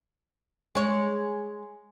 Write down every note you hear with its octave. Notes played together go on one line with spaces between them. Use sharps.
G#3 C#5